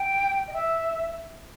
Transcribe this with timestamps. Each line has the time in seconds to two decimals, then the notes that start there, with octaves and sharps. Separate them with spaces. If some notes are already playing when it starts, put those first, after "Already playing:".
Already playing: G5
0.47 D#5
0.53 E5